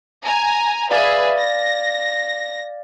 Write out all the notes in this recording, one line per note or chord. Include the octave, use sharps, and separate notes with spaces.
G#5 A#5
G#4 B4 D5 E5 F5 A6
A#6